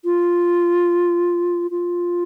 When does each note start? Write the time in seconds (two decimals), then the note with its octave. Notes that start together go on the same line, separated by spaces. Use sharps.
0.05 F4
1.71 F4